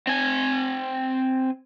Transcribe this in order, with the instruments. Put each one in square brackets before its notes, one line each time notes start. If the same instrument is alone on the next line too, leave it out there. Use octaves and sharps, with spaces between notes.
[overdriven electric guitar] C4 G#5